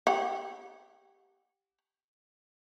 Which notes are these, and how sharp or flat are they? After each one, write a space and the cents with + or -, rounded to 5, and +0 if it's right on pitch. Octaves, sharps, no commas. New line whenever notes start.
G4 +0 F#5 -25